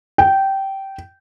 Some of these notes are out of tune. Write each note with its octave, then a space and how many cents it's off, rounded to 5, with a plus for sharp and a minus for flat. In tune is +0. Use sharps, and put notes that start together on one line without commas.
G5 -15